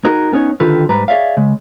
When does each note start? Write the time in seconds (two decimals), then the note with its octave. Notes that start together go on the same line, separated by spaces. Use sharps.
0.04 D#4 F#4 G#4 A#4
0.32 B3 C#4 D#4 C#5
0.60 D3 D#3 F4 G4 A4 B4
0.89 G#2 G3 B4 A#5
1.08 G#4 C#5 D5 E5 F5
1.37 C#3 G#3